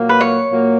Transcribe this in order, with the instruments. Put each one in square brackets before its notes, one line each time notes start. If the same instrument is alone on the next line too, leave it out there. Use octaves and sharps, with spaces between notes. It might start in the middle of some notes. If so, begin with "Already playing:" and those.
Already playing: [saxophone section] A#2 F#3 A#3
[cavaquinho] B4
C#5
[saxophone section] A#2 F#3 A#3